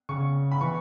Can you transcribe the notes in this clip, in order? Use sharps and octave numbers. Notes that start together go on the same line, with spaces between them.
C#3 C#6
B5
E3 C#6